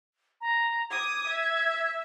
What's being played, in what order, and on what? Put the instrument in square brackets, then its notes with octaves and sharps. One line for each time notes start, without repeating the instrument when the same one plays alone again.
[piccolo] A#5
[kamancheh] D6 D#6 [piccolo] G#6
[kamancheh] E5